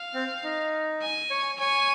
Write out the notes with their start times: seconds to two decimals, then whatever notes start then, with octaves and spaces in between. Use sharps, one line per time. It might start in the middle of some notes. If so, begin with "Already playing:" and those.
Already playing: F5
0.14 C4
0.43 D#4
1.02 G#5
1.30 C#5
1.59 C#5 G#5